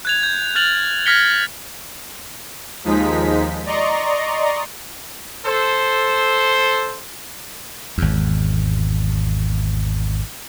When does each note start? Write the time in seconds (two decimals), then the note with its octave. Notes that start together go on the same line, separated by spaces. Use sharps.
0.05 F#6 G#6 F7
0.23 G6
0.55 F6 A6 F7 F#7
1.06 F6 G#6 A#6 B6 C#7 G7
2.84 D#2 F3 G#3 D#4 B6
3.66 D5 D#5 A#5 C6 C#6
5.46 A4 C5
7.98 G#1 E2